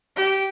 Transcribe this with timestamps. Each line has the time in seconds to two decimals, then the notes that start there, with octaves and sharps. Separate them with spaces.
0.16 G4